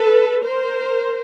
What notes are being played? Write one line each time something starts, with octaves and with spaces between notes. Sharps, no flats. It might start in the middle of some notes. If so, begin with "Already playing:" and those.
Already playing: A4 B4
A#4 C5